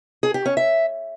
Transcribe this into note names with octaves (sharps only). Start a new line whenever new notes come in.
G#4
G4
C#4
E5